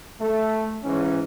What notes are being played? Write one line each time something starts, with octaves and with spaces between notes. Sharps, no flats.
A3
G#2 E3 C#4